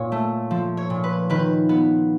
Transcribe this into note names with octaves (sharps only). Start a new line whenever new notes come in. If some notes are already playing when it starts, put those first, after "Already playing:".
Already playing: A#2 C#5
A3
F3
C#5
A#2
B4
D#3 B4
B3